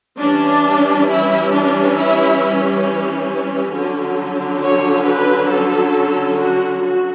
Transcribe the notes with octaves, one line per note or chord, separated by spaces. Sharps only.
E3 G3 C#4 D4
E4
D4
E4
D3 F#3 C#4
C#5
B4
A4
F#4
F#4